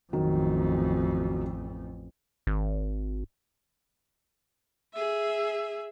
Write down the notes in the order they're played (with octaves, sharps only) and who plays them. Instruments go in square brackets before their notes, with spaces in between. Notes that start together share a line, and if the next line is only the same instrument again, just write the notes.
[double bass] A1 F2 [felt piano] D#3 F#3
[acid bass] G#1
[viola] G#4 E5